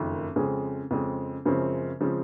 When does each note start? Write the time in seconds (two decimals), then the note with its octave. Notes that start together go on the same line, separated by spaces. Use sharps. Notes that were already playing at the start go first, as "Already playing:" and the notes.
Already playing: F#1 F2 D#3
0.36 F2 C#3 G#3 C4
0.91 F2 C#3 G#3 C4
1.46 F#2 C#3 F3 G#3 C4
2.01 C#3 F3 G#3 C4